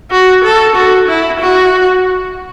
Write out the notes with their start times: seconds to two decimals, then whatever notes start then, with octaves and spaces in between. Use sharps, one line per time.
0.11 F#4
0.44 A4
0.76 F#4
1.08 E4
1.40 F#4